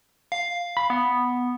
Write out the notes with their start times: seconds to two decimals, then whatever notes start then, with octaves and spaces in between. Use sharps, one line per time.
0.32 F5
0.77 B5
0.90 B3